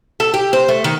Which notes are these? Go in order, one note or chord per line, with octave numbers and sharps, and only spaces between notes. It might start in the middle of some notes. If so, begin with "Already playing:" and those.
A4
G4
C5
A3
D#3